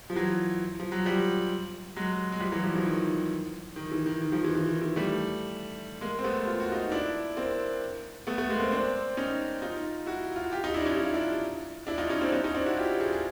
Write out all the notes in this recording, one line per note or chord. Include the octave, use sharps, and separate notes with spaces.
F3
E3 F#3
F3
F#3
F3 G3
F#3 G#3
G#3
F3 G3
E3 F#3
F3 G3
D#3 F3
D#3
D#3
E3
D#3
D#3
D#3 F3
E3
E3
D#3
E3
G3 A3
G#3 A#3
C4
A3 B3
F4
F#4
D#4 F4
D4 E4
A#3 C4
A3 B3
A3 B3
G#3 A#3
A#3 C4
C4 D4
C#4 D#4
D#4 F4
E4 F#4
F4
F#4
F4 G4
D#4 F4
D4 E4
C#4 D#4
E4
F4
D4 E4
D4 E4
D#4 F4
C#4 D#4
C4 D4
C#4 D#4
C#4 D#4
C4 D4
E4 F#4
F4 G4
F#4 G#4
G#4